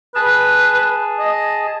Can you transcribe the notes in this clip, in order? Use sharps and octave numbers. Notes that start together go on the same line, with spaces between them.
G#4 B4 A5
D#5